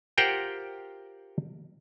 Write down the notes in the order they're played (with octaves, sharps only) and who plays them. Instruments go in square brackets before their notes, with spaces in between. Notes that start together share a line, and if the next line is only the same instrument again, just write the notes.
[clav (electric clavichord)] F4 G4 A#4 C5 F#5 G5